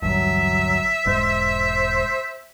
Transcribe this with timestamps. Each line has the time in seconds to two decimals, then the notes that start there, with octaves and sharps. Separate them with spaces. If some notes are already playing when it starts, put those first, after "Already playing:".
0.02 A1 D2 G2 F#3 E5
1.06 E1 G#2 G#3 C5